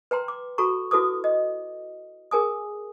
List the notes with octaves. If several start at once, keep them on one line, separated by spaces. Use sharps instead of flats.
B4 G5 A#5 C6
D6
F#4 A4 A#5 C#6
E4 F#4 A4 B4 D6 D#6
D#5
G#4 A#4 G#5 D#6